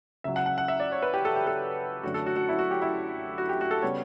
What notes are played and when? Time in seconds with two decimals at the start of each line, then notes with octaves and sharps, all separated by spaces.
0.24 C#2 C#3 F#3 E5
0.36 F#5
0.46 F#5
0.58 F#5
0.68 E5
0.80 D5
0.92 C#5
1.03 B4
1.14 G4
1.25 A4
1.36 G4
1.47 A4
2.03 F#2 D3 A3 D4 F#4
2.14 A4
2.26 F#4
2.36 F#4
2.49 E4
2.59 F#4
2.71 G4
2.82 E4
3.38 F#4
3.49 G4
3.61 F#4
3.71 A4
3.82 C#3 G3 B3 C#5